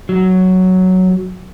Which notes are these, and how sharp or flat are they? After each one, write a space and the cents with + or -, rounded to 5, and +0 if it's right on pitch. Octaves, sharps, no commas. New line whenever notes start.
F#3 +5